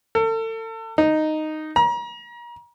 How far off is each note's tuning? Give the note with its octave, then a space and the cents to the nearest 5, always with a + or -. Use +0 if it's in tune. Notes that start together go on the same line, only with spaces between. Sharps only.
A4 +35
D#4 -5
A#5 +35